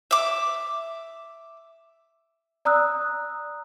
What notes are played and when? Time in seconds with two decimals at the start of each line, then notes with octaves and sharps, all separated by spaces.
0.11 E5 D6
2.65 D5 A#5 D#6 E6 F#6